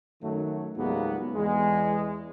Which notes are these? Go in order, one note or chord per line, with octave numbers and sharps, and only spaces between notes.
F#2 D#3 F#3 A3
C#2 G#2 F#3 G3 A#3 B3
E2 G#3